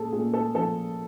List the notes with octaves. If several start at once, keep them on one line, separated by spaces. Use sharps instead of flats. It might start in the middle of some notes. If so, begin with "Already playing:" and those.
Already playing: A#2 G#4 A4
A#2 G#4
A4
F3 A4